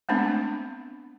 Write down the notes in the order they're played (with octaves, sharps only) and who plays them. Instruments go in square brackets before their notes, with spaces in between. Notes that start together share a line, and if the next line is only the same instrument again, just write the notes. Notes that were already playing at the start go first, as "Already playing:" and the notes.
[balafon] G#3 A3 B3 C4 D4